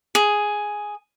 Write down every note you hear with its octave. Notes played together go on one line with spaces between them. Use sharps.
G#4